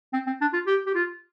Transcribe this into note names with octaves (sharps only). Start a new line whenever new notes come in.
C4
C4
D4
F4
G4
G4
F4